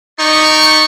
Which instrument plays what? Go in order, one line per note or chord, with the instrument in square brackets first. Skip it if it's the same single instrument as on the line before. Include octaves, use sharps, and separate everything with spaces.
[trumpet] D#4 [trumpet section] G4 D5 C#6